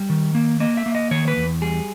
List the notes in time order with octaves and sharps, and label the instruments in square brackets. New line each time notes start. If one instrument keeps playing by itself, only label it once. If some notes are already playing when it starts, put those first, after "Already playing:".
Already playing: [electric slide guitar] G3
D#3
A#3
A#3 D#5
E5
A#3
D#5
D#3 C#5
B4
E2
G3 G#4